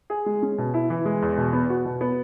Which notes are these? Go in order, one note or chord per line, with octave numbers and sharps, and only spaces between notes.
G#4
G#3
C#4
B2
E4
E3
G#3
E2
B2
B3
F#4
B2
B3